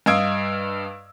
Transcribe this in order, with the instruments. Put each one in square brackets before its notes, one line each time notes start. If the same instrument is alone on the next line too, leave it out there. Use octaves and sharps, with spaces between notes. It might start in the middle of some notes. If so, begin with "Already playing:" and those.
[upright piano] G2 D#5 F5 E6 G#6 D7